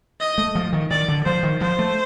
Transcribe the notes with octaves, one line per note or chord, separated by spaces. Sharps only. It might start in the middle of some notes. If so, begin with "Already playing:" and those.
D#5
A3
F3
D#3
D#3 D5
D3
F3 C5
D#3
F3 C5
A3